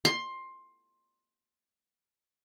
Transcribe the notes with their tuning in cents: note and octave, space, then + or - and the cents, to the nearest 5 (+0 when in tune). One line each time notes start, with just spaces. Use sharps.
C6 +15